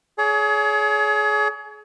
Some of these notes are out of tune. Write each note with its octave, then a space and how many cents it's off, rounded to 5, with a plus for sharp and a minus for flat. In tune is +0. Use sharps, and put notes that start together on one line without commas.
G#4 +30 C#5 +40